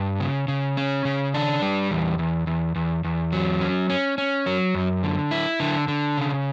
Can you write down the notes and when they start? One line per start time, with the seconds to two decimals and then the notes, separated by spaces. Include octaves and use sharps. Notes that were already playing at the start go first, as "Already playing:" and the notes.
Already playing: G2
0.20 C#3
0.48 C#3
0.77 C#4
1.05 C#3
1.34 D4
1.62 G3
1.91 E2
2.19 E2
2.47 E2
2.76 E2
3.04 E2
3.32 F#3
3.61 C#4
3.90 C#4
4.18 C#4
4.46 F#3
4.75 F#2
5.03 D3
5.31 E4
5.60 D3
5.88 D3
6.17 C#3